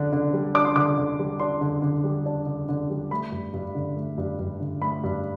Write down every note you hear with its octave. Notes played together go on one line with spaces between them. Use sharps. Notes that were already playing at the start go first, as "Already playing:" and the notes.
Already playing: D3 D4
D3
G3
D4 D6
C6
D3 D6
D3
G3
D4 C6
D3
D3
G3
D4
D3
D3
G3
A3 B5
G2
G2
D3
A3
G2
G2
D3
A3 B5
G2